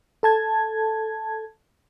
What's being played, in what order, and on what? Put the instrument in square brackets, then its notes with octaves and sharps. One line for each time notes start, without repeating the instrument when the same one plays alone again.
[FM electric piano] A4 A5 G#6